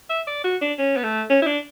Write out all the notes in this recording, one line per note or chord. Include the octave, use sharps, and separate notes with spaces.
E5
D5
F#4
D4
C#4
B3
A3
C#4
E4
D4